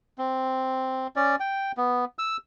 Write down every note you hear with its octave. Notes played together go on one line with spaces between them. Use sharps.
C4
C#4 D5
G5
B3
E6